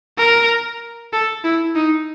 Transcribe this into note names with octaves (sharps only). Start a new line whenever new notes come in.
A#4
A4
E4
D#4